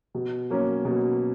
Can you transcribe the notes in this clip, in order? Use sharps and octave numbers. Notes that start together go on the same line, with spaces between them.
B2
F#3 A#3 C#4
B2